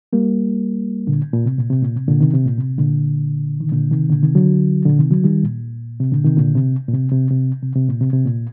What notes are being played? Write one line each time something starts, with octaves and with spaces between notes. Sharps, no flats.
G3 A#3
A#2 D3
A#2
C3
A#2
C3
A#2
C3
A#2 D3
C3 D#3
C3
A#2
C3
A#2 D3
D#3
A#2 D3
C3 D#3
A#2 D3
C3 D#3
D3 F#3
A#2 D3
C3 D#3
D3 F#3
D#3 G3
A#2
C3
A#2 D3
C3 D#3
A#2 D3
C3
A#2
C3
C3
C3
C3
C3
A#2
C3
C3
A#2